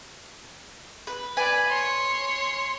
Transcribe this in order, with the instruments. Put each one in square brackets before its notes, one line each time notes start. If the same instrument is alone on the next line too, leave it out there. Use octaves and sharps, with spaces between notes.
[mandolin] B4
[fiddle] B4 D5 [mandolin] G#5
[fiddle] C#5 C6